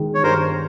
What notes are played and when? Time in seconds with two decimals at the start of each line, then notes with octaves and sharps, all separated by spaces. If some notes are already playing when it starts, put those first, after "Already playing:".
Already playing: D#3 G#3
0.15 C#5
0.23 G2 A#4 C5